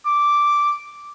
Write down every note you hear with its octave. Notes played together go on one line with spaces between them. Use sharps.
D6